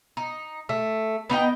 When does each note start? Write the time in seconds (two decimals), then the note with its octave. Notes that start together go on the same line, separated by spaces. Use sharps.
0.17 D#4
0.69 A3
1.30 B3 D#4 D#5 G5